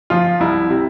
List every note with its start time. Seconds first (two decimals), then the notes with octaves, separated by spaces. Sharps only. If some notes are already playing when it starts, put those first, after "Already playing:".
0.10 F3 F4
0.40 C2 E4
0.70 C3